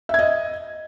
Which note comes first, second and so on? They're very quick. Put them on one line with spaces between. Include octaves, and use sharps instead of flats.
E5 G#6 D#5